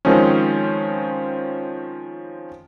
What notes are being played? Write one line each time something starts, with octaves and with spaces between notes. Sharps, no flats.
D#3 F3 G#3 C4 C#4